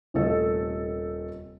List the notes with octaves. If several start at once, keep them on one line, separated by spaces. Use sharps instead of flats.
D#1 C3 A3 A4 D#5